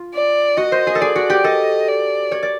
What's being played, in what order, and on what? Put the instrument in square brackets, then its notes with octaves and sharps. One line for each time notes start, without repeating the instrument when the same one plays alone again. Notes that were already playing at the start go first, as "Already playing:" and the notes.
Already playing: [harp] F4
[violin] D5
[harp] F#4 [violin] D#5
[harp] C5
G#4
A4
[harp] G#4 [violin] D5
[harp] F#4
G4
[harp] A4 [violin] D#5
[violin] D5
[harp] C#5
D5